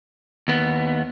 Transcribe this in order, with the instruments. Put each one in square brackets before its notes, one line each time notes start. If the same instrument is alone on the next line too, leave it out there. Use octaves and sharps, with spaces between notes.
[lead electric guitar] D#2 B3